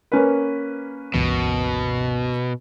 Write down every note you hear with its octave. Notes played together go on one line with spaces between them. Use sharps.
A#3 C#4 B4
G1 C#2 B2 E3